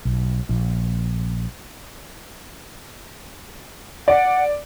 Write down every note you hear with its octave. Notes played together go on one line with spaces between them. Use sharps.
B1
A#1
D5 F#5